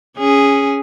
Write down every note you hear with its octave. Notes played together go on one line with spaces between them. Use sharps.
C#4 G#4